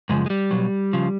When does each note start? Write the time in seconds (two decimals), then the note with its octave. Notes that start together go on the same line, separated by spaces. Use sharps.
0.09 F#2 C#3 F3 G#3
0.26 G#3
0.30 G3
0.51 B2 F#3
0.93 C#3 F3